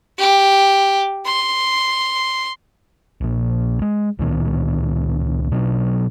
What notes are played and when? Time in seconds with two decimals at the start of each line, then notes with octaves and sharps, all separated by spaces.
0.18 G4
1.26 C6
3.21 A#1 A#2
3.82 G#3
4.19 C#2 A#2 D#3 B3
5.52 B2 F#3 D4